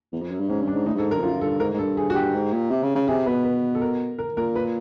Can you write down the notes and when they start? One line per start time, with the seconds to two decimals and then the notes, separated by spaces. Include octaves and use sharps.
0.13 E2
0.22 F2
0.31 F#2
0.40 G2
0.49 G#2 C#4
0.61 G2
0.67 D4
0.74 G#2
0.86 A2 D#4
0.94 G2
0.98 G#2 A4
1.11 G2 A#4
1.19 F2
1.23 F#2 F4
1.41 G2 A4
1.59 G#2 A#4
1.74 G#2
1.79 G2 A4
1.97 G#4
2.10 F#4
2.15 G4
2.34 G#2
2.53 A#2
2.71 C3
2.83 C#3
2.95 C#3
3.08 C3 G#4
3.26 B2 B4
3.44 B4
3.75 A4
3.81 A#4
4.19 A#4
4.37 A#2 A#4
4.56 B4